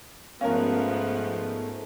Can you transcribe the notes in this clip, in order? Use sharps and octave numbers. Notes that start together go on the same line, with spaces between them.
G#2 F3 A3 B3 C#4 A#4 F5